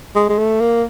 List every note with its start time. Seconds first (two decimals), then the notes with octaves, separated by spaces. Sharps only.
0.15 G#3
0.29 G#3
0.38 A3
0.61 A#3